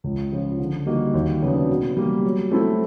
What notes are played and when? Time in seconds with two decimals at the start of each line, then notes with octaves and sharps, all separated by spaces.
0.04 C#2
0.32 C#3 F3
0.59 D3
0.86 G3 A#3 D#4 F#4
1.14 D#2
1.42 C#3 F#3 B3 D4
1.69 B2
1.97 G3 A#3
2.25 F#3
2.52 A3 C4 E4 A4